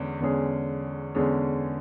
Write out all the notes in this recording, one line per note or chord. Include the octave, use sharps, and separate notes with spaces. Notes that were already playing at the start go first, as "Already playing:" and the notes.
Already playing: E2 D3 G#3 C#4
E2 D3 G#3 C#4 G#4
E2 D3 G#3 C#4 G#4